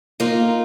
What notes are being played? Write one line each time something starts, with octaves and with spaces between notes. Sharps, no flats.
A#3 D#4 F4